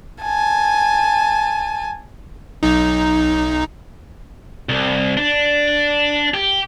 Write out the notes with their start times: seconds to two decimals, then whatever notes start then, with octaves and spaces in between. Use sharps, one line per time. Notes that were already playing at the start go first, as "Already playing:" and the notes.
0.22 G#5 A5
2.63 B1 D#4
4.69 C2
5.17 D4
6.34 G4